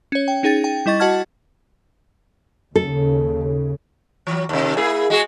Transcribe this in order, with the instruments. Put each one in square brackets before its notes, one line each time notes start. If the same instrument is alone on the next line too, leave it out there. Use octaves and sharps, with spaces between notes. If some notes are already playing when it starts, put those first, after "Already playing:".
[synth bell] C#4 C#5
G5
C#4 D#4 G#4 G5 A6
G5
G3 E4 D#5 C#6 A6
F#4 D#5 F#5 A5 F6 G#6
[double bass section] D#2 C#3 [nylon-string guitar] A4
[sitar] E3 F#3
D#2 C3
A#3 E4 G#4
G#3 F#4 G#4